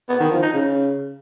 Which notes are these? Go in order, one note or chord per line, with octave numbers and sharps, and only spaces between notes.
B3
D#3
F3
D#4
C#3